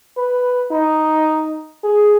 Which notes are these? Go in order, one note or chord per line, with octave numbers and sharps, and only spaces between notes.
B4
D#4
G#4